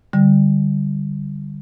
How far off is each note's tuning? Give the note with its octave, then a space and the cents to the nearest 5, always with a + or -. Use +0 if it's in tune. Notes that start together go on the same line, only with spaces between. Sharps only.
D3 +0 G3 +0